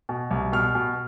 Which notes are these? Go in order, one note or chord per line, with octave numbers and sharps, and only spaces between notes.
B2
C2
B2 F6
B2